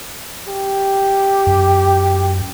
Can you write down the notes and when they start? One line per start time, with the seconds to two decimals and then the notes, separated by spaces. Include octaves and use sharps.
0.48 G4
1.47 F#2